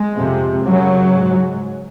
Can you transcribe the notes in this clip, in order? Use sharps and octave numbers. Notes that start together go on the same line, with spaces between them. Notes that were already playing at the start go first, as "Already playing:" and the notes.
Already playing: G#3
F2 C3
F#2 C#3 F#3
G#2